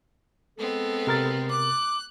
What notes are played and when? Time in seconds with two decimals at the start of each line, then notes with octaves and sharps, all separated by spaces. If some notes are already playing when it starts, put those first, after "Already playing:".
0.58 G#3 B3 C4 A4
1.07 C3 A#4 A6
1.50 D6 F#6